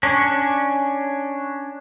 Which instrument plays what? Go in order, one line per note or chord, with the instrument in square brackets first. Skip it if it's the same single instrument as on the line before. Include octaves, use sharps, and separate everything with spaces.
[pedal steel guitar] C#4 D4